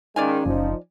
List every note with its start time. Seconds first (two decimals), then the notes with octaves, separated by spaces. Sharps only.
0.16 D#3 G#3 C#4 D5 F5 G#5
0.46 F#1 F3 D#4